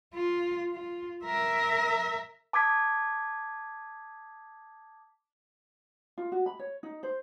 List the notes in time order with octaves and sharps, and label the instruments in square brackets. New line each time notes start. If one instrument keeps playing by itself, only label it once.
[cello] F4
F4
A#4 E5
[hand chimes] A5 D6 D#6 G#6 B6
[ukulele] F4
F#4
B5
C#5
D#4
C5